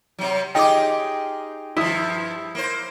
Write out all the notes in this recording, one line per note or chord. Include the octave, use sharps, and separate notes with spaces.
C3 F#3
D#4 F4 G4 G#4 G5 D6
G2 F3 E4 D#6
A#3 C5